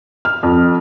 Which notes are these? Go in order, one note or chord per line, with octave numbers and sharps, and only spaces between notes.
F6
F2